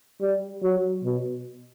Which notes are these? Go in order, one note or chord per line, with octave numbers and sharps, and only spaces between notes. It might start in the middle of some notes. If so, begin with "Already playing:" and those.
G3
F#3
B2